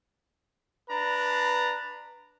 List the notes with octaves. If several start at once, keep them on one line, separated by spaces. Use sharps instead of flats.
D4 B4 A#5